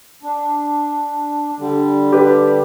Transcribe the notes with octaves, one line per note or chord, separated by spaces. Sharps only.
D4
D3 G3
G4 B4 D5